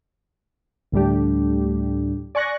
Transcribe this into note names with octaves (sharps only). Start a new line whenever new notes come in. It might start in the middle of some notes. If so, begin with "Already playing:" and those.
D2 A2 G3 D4 G4
D5 G#5 C#6 F#6 A#6